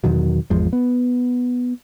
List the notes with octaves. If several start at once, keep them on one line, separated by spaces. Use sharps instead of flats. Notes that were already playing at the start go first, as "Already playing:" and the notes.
E2 B2 D#3 F#3
G#1 E2 F3 G#3
B3